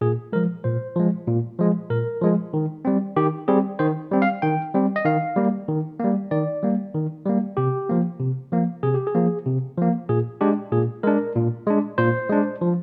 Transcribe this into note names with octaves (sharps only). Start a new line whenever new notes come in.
A#2 G#4
F3 G#3 A#4
A#2 C5
F3 G#3
A#2
F3 G#3
A#2 A#4
F3 G#3
D#3
G3 C4
D#3 G4
G3 C4 G#4
D#3 C5
G3 C4
F5
D#3 G5
G3 C4
D#5
D#3 F5
G3 A#3
D#3
G3 A#3
D#3 D5
G3 A#3
D#3
G3 A#3
C3 G4
F3 A#3
C3
F3 A#3
C3 G#4
G4
G#4
F3 A#3
C3
F3 A#3
A#2 G#4
G#3 D4 G4
A#2 G#4
G#3 D4 A#4
A#2
G#3 D4
A#2 C5
G#3 D4
F3